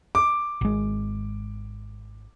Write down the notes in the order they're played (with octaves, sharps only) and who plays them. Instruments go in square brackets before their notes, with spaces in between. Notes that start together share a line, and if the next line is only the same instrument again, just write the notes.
[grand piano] D6
[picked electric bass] G#1 G#3